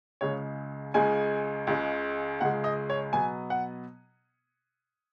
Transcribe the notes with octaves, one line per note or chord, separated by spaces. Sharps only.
C#2 C#3 G#3 C#5
C#2 C#3 G#3 G#5
C#2 C#3 G#3
C#2 C#3 G#3 F#5
D#5
C#5
B2 F#3 B3 G#5
F#5